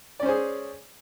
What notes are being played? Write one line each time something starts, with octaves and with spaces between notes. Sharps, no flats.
C#4 G#4 C5 D5